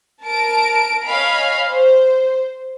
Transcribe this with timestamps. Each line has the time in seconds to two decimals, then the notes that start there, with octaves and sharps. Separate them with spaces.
0.21 A#4 A5 D7
1.04 C#5 D#5 F5 G#5 B5
1.66 C5